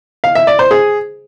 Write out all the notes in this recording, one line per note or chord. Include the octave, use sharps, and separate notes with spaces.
F5
E5
D5
C5
G#4